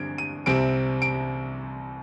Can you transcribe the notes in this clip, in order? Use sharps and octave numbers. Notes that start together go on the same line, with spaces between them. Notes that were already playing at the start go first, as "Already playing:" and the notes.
Already playing: G2 D3 C4 G#6 D7
D#7
C2 C3 G3 C4 D7
D7